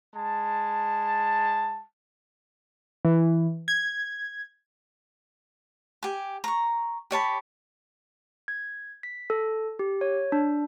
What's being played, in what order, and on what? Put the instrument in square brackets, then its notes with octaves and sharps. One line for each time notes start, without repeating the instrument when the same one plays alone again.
[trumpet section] G#3 A5
[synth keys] E3
G#6
[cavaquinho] G4 G#5
A#5 C#6
G4 C#5 A5 B5
[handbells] G#6
B6
A4
G4
C#5
D4